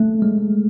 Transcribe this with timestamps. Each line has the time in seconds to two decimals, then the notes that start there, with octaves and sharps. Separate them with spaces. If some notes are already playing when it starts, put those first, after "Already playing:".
Already playing: A3
0.22 G#3